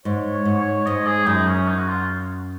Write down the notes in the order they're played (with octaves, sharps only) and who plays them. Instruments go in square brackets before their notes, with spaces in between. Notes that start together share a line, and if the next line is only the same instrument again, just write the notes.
[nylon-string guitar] G#2 [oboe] C#5
[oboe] C#5
[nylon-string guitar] G#2
[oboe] C#5
[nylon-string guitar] G#2 [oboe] D#5
[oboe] G#4
[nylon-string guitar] F#2 [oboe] D#4
[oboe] C#4
D#4
F#4
F4